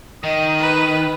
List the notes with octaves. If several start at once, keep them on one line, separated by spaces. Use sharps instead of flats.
D#3 D#5 D#6
B4